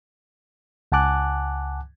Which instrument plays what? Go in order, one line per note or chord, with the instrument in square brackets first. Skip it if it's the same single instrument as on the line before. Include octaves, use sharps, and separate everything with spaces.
[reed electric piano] C#2 F#5 G#5 A5 D6 F#6